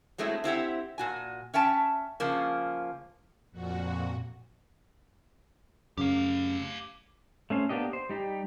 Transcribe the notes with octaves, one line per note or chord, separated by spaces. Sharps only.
F#3 G#3 A3 C4 E4
C4 E4 G4 F#5
A#2 F#4 G#5
C#4 E5 G5 A5
C#3 F3 A#3
F2 A#2 F#4
F#2 C#3 G4 F5
A3 C#4 C5
A#3 B3 D4 G4 D#5
C5
G3 D#4 G4